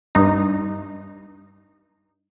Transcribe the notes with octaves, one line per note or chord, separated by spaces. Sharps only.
G2 D#4